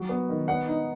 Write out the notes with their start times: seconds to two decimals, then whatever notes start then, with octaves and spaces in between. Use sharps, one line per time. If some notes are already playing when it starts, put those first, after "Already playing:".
Already playing: F#3
0.09 B3
0.29 D#3
0.48 B3 F#5
0.68 D#4